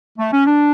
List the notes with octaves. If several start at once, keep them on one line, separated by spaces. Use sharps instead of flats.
A3
C#4
D4